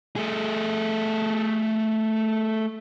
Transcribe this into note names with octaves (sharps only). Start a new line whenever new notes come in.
A3 G#4